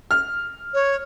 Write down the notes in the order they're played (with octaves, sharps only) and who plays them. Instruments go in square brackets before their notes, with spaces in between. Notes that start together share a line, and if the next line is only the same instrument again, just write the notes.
[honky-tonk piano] F6
[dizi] C#5